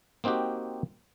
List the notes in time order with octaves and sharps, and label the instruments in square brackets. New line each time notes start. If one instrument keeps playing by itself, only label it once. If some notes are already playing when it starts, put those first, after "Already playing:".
[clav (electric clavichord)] A#3 C4 D#4 F#4 G4